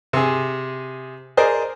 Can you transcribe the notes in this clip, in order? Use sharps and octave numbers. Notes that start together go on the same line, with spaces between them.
C3 G#4
G#4 A#4 C5 D5 D#5